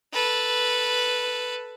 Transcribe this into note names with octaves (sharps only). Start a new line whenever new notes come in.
A4 B4